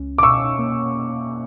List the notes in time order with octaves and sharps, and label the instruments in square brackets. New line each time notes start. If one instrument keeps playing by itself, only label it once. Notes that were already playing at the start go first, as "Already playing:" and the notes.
Already playing: [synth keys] C#2 C#4
[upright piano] D6
[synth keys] B2 [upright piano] C#6 E6
[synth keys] A#3